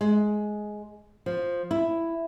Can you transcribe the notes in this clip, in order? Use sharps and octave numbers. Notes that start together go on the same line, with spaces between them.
G#3
F3
E4